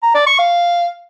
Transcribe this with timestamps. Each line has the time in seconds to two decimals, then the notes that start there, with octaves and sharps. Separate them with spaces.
0.03 A#5
0.15 D5
0.27 C#6
0.39 F5